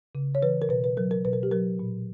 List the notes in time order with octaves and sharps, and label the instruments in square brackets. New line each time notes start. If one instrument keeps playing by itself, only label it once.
[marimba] C#3
C#5
E3 B4
A#4
B2 B4
B4
F#3 A#4
A#4
B2 B4
A#4
G4
F#3 A#4
A#2